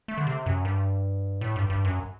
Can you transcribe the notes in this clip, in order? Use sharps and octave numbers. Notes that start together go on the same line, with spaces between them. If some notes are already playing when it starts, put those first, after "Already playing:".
A3
D3
C3
F#2
G2
A2
G2
G2
F#2